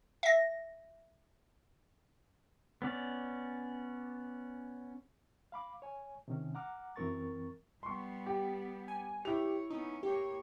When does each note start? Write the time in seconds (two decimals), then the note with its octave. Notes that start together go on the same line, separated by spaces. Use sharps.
0.23 E5 A#6
2.82 B3 C#4 D5
5.52 F5 B5 D6
5.82 C#5 G#5
6.28 C3 D#3 C#4
6.55 F#5 A#5 D6 F6
6.96 F#2 E3 C4 A#4 C#6 A6
7.83 G3 B3 C6 C#6
8.26 G4
8.88 G#5
9.25 E4 G4 C#5 F7
9.71 B3 C#4 D#4
10.03 A#3 G4 C#5